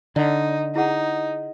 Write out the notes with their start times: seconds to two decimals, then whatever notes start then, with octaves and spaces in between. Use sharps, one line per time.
0.16 D3 D#4 D5
0.76 D#4 E4 G#4 F#5